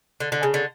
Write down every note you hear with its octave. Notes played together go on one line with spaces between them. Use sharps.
D3
D3
C#3
D3